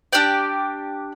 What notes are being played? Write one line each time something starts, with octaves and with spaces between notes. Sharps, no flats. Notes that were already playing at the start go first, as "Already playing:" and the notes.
D4 G4 D5 G5